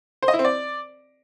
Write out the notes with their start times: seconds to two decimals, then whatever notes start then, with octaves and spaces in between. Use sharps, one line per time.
0.22 C5
0.28 D#5
0.34 E4
0.39 C4
0.45 D5